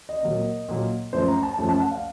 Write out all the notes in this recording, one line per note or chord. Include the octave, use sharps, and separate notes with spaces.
D#5
A#2 F#3 A#3
A#2 F#3 A#3
F#2 F3 A3 C5
A#5
A5
F#2 F3 A3 A5
A5
F#5
F5